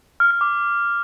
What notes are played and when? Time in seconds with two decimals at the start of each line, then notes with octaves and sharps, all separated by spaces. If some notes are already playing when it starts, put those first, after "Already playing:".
0.20 F6
0.31 F6
0.41 D6